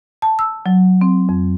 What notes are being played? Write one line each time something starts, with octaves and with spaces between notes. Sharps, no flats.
A5
E6
F#3
C4
F2